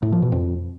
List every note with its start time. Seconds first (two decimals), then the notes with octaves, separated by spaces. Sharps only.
0.02 A2
0.12 F3
0.22 B2
0.32 F2